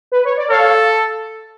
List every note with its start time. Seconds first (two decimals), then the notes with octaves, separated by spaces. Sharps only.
0.12 B4
0.25 C#5
0.37 D5
0.50 A4 C#5 F5